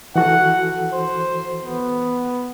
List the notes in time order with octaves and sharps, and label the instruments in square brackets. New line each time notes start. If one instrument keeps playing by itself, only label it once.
[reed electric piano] E3 F#4 A4 [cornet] F#5
[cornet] C5
B3